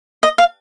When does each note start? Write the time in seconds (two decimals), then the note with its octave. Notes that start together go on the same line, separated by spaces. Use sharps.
0.23 D#5
0.38 F5